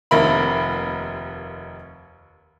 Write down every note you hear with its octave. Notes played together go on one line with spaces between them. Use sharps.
F1 D#2 A#4 E5 B5